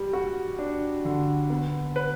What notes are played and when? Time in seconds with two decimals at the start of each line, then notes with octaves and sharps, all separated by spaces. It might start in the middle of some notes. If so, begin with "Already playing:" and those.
Already playing: G3
0.13 F#4
0.59 D4
1.05 D3
1.50 B3
1.96 B4